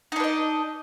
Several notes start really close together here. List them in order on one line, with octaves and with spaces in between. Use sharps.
D#4 D4 B4 D#5